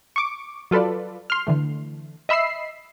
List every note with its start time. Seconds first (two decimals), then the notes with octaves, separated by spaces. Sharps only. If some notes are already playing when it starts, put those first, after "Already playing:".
0.16 C#6 D6
0.71 F#3 F4 A4 B4 D5
1.30 C6 F6
1.47 D3 E3 A3
2.29 D#5 E5 B5 E6 C7